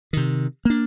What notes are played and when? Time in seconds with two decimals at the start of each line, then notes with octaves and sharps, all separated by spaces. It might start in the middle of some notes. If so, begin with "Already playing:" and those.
0.13 C3 D#3
0.65 A#3 D4